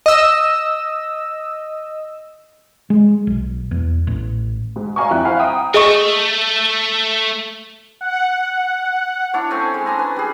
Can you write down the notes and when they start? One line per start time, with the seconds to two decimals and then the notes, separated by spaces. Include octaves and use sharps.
0.06 D#5 E6
2.90 G#3
3.27 B1
3.71 E2
4.07 A1
4.76 G#2
4.96 D5 D#5 F5 G#5 A#5 C#6
5.11 F2 E4 G5 F#6
5.24 E4 C5 E5 F5 G#5 B5
5.39 F#5 G5 A#5 D#6
5.74 A3 G#4 D#5 C#6
8.01 F#5
9.34 D4 E4 C#5
9.51 A3 C4 C#4 G#5
9.74 G#3
9.86 C#4 D4 G#5 A#5
9.99 B4
10.16 G3 G#4